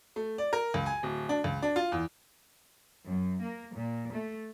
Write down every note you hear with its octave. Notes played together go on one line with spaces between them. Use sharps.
A3
D5
A#4
C#2
G#5
D1
D4
C#2
D4
F4
E2
F#2
A#3
A#2
A3